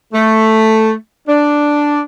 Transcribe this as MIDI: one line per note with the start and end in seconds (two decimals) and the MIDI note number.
0.13 0.92 57
1.28 1.99 62